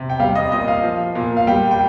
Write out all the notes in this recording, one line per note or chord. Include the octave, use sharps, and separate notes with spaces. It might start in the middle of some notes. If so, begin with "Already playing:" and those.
Already playing: C3
G5
G3 F5
D#5
A#2 D#5
F5
F3
A#2
F5
G3 G5
G5